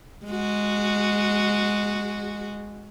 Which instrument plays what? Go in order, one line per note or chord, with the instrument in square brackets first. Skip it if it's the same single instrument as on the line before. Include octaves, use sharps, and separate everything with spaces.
[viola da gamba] G#3 F#4